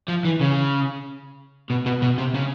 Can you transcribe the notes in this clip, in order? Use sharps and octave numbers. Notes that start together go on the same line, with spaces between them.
F3
E3
C#3
B2
B2
B2
C3
C#3